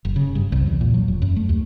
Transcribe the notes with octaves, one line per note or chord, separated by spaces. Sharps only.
F#1
C#3
G2
C2
E2
A#2
F#3
E1
F#2
A3
D#2